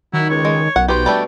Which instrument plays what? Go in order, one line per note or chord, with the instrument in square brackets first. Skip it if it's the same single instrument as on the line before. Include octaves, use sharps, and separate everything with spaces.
[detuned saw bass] D#3 [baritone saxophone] F#3 [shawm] E4
[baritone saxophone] C#2 [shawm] C#5
[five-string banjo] G#3
[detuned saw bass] B1 [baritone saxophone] F#2 [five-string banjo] F#5
[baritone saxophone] B2 [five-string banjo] G4 C5 [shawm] G5
[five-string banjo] G3 A3 D4